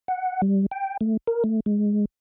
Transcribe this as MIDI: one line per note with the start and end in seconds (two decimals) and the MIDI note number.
0.08 0.41 78
0.42 0.66 55
0.71 0.97 79
1.01 1.17 57
1.27 1.44 70
1.44 1.60 57
1.66 2.05 56